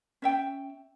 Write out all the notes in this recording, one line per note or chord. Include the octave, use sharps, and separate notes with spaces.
C#4 E5 G5